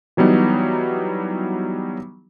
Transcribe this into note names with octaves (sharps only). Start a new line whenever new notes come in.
E3 F#3 G3 B3 D#4